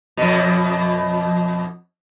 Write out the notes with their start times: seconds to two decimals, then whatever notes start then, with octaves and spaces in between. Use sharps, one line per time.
0.17 F2 B2